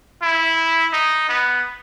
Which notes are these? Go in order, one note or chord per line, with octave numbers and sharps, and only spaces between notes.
E4
D#4
B3